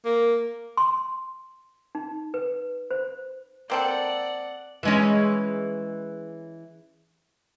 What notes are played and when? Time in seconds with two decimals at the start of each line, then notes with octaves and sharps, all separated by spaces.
0.05 A#3
0.77 C6
1.95 D#4
2.34 B4
2.91 C5
3.70 A#3 C4 A4 D5 F#5
4.83 E3 G#3 C#4